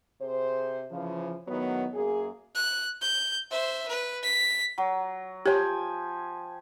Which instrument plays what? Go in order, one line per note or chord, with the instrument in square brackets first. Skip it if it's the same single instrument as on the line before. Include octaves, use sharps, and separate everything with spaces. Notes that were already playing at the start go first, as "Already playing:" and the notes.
[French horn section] C3 G#4 C5
C#3 E3 F3
A2 D#3 F#3 B3
F#2 A#3 G#4
[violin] F#6
G6
C5 E5
B4
B6
[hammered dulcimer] F#3
[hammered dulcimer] F3 G5 G#5 [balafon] G4 C#5